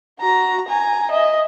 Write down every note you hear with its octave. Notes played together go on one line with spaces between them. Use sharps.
F#4 A#5
G#5 A#5
D#5 E5